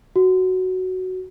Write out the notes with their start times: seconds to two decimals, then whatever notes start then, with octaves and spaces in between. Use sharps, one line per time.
0.16 F#4